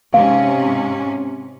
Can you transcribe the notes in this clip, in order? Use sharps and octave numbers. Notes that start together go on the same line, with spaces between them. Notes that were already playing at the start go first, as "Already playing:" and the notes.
G#2 C3 C#4 F5